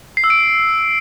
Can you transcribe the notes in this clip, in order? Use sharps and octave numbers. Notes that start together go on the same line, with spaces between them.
C7
E6
D7